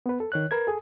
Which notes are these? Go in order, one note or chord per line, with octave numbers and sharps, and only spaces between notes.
B3 B4
A4
D#3 C#5 F#6
A#4 B4 G#6
G#4 A4